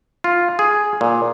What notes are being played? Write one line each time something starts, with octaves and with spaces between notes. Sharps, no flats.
F4
G#4
A#2